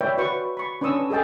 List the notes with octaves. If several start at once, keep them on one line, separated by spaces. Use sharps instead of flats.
B4 C#5 D5 E5 G5
F#4 B4 C#6
B5 C#6
C#4 D4 B4 C#6 D#6 E6
G#4 A4 D#5 G5 A5